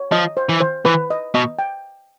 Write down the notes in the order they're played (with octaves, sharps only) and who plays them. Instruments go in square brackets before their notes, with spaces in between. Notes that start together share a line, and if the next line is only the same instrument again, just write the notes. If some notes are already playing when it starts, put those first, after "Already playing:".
Already playing: [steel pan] C#5
[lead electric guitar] F3 [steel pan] D#5
[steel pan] C5
[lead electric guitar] E3
[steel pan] C5
[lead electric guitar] E3 [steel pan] B4
[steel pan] D#5
[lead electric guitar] B2 [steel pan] D#5
[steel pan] G5